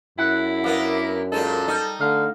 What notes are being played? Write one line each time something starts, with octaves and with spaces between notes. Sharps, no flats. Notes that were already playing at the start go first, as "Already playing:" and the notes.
F#2 E4 F#5
A#3 B3 D4
A#2 G#3 D#4 A4
G3 D#4
D3 A3 F5